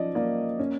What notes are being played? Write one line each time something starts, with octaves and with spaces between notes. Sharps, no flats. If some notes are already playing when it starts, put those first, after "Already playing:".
Already playing: F3 C#4 D5 D#5
A#3 D5
C#4